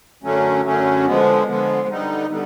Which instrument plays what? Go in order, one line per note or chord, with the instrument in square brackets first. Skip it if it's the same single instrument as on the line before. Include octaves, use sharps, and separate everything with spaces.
[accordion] F#2 D3 F#3 A3 C#4
F#2 D3 F#3 A3 C#4
D3 F3 G#3 B3
D3 F3 G#3 B3
D3 G3 B3 D#4
D3 G3 B3